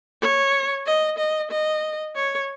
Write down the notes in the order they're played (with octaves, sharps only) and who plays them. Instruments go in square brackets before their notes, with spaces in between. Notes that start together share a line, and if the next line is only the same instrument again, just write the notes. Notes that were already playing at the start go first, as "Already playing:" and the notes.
[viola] C#5
D#5
D#5
D#5
C#5